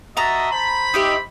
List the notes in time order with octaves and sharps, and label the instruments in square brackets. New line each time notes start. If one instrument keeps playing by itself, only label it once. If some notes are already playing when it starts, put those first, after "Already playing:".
[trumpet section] F#4 D#5 E5 [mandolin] A5 A#5 D#6
[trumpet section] C5 B5
[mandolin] D#4 G4 E5